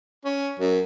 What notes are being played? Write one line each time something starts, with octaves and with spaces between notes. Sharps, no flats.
C#4
F#2